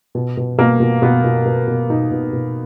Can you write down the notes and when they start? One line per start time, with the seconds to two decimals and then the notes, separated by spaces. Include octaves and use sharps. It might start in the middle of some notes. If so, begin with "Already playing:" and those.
0.15 B2
0.37 B2
0.58 B2 A#3
0.80 B2
1.02 B2 B3
1.24 B2
1.45 B2
1.68 B2
1.90 B2 D#4
2.11 B2
2.33 B2